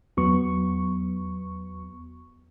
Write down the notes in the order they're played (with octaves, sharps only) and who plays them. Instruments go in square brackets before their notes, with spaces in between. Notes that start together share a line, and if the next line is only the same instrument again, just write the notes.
[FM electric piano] E2 F#3 B3 C#6